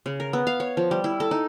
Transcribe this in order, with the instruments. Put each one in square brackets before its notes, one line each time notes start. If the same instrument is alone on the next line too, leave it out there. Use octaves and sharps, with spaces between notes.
[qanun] C#3
A#4
B3
F5
C#5
F3
G3
E4
A4
D#4